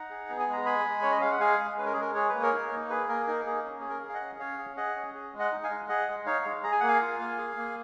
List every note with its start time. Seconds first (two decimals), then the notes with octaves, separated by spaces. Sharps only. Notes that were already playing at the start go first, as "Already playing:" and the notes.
Already playing: D#4 F#5 A#5
0.10 G#4
0.29 B3
0.39 G#5
0.48 G#3
0.53 A#5
0.65 G#4 G#5 B5
0.85 G#3
1.02 C#4 C#5
1.11 D#5
1.21 G#3 F5
1.31 F#5
1.40 G#4 F5 G#5
1.59 G#3
1.78 C#4 B4
1.85 A#4
1.93 G#4
1.96 G#3 A#4
2.15 G#4 C#5
2.29 B4
2.34 A#3
2.42 A#4 C#5
2.52 D#4
2.71 A#3
2.90 G#4 B4
3.09 A#3 A#4
3.27 D#4 A#4
3.45 A#3 G#4
3.64 C#4
3.80 G#4
3.89 A#4
4.02 G#4
4.09 F5
4.14 D#5 F#5
4.21 C#4
4.39 C#4 C#5 F5
4.58 G#4
4.77 G#4 D#5 F#5
4.96 C#4
5.14 G#4
5.33 G#3
5.39 D#5 F#5
5.52 D#4
5.64 F5 G#5
5.70 G#3
5.88 G#4 D#5 F#5
6.08 G#3
6.26 D#4 C#5 F5
6.45 G#3
6.63 G#4 A#5
6.72 G#5
6.80 A#3 F#5
6.88 F5 G#5
7.01 F4
7.20 A#3
7.38 G#4
7.57 A#3